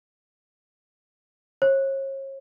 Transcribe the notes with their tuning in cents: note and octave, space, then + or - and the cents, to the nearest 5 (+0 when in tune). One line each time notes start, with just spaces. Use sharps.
C#5 -40